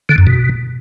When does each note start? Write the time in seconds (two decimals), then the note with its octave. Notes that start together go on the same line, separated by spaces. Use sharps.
0.09 D3
0.18 F#2
0.27 B2